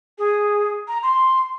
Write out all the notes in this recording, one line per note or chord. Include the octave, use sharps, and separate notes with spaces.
G#4
A#5
C6